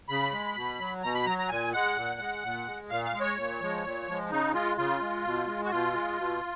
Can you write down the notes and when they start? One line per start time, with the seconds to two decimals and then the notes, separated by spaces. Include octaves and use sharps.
0.09 C#3 B5
0.33 G#3
0.56 B2
0.79 F#3
1.03 B2 A#5
1.15 B5
1.26 F#3 A#5
1.39 A#5
1.49 A#2 G#5
1.73 G#3 F#5
1.96 A#2
2.20 G#3
2.43 A#2
2.67 G#3
2.90 A#2 F5
3.05 F5
3.13 G#3
3.21 C#5
3.37 A#2
3.61 F3 G#3
3.84 A#2
4.07 F3 G#3
4.30 C#3 D#4
4.53 G#3 F4
4.77 C#3 F4
5.01 G#3
5.24 B2
5.47 G#3
5.64 F#4
5.70 B2 F4
5.94 G#3
6.17 B2